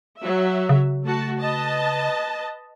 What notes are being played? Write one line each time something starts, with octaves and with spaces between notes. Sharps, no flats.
F#3 E5
C#3
A3 F#4 A5
B4 D#5 A5